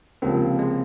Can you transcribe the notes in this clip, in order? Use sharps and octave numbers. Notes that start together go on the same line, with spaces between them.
C#2 C3 F3 A#3 C4
G#3